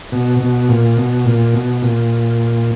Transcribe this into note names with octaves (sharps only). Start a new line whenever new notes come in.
B2
B2
A#2
B2
A#2
B2
A#2